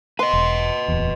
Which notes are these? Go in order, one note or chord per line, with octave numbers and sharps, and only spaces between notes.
B4 D#5 C6
E1
D1 E2